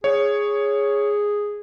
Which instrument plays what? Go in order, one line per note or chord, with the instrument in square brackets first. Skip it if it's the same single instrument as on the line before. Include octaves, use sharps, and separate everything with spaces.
[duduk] G#4 [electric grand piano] C#5